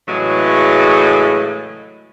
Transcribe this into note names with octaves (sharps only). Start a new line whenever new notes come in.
A2 C#3 E3 F#3 G#3